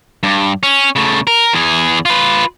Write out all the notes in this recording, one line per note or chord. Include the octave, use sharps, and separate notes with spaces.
G2
C#4
C#3 A3
A#4
E2 G#4
F4 B4